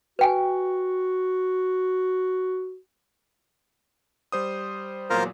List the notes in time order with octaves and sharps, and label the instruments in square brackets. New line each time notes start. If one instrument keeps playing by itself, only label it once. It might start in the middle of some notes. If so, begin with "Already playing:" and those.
[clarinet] F#4 [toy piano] B4 G5 G#5
[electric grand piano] G3 C5 D#6
[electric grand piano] E2 A#2 F#3 [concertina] F4 A#4 C5